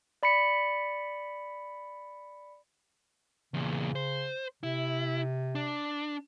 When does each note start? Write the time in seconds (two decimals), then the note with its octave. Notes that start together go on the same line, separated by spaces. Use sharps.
0.23 D5 B5 B6 C#7
3.54 E2 A#2 C#3
3.96 C5
4.63 C3 E4
5.55 D4